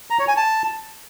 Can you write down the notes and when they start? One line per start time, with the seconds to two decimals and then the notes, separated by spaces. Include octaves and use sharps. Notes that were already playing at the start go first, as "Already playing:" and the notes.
0.10 A#5
0.19 C#5
0.28 G#5
0.37 A5